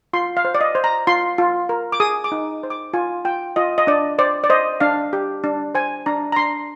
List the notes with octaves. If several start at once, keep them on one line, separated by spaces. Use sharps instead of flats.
F4 C6
F5
C5
D5
D#5
C5
A#5
F4 C6
F4
A#4
D6
G#4 D#6
D6
D#4
C5
D6
F4 G#5
F4 G5
F4 D#5
D#5
D4 D5
C5 D5
D5
C5 D#5
D4 F5
G4
D4
C5 G#5
D4 A#5
A#5
D4 C6